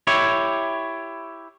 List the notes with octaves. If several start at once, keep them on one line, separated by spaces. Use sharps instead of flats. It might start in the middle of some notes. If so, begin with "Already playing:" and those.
E4 G4 C#5